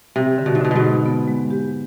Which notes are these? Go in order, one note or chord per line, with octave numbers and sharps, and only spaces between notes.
C3 C4
D3
B2
G#2
B2 D3
G#2 B2
D3
B3
G#3
G4